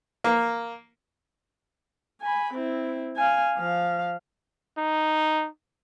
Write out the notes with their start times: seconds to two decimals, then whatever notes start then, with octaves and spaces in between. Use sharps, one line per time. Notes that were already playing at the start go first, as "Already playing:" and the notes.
0.24 A#3
2.22 G#5 B5
2.54 C4 E4
3.16 F5 G#5
3.58 F3 F5
4.78 D#4